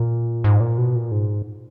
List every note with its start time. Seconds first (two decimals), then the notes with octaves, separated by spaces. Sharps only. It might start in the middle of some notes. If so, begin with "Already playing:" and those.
Already playing: A#2
0.44 G#2
0.60 A#2
0.78 B2
0.96 A#2
1.11 G#2